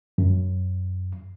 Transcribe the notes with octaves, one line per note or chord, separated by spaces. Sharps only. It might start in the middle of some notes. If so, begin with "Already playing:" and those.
F#2